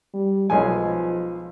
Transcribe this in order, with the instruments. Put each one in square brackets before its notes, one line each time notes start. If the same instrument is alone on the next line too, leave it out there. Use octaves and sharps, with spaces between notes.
[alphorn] G3
[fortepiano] B1 G#3 G#5 [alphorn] F3